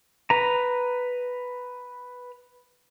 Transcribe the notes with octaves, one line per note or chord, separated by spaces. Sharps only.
B4 A#5